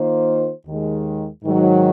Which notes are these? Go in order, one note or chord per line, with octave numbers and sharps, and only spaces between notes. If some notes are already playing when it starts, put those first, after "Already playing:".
Already playing: D#3 A#3 F4 C5
D#2 D#3 G#3
G#2 D#3 F#3